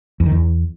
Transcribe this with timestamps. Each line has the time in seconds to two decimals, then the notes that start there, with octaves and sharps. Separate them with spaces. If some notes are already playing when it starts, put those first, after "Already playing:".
0.20 E2
0.26 D#3
0.32 E2